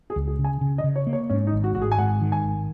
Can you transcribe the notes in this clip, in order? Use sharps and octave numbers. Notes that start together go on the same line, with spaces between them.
G#4
C#2
G#4
C#3
G#5
C#3
D#5
C#3
C#5
A#3
C#5
G#2 C#4
D#4
G#1
F#4
G#1 F#4
G#4
G#5
G#2 F#5
D#3
G#5
G#1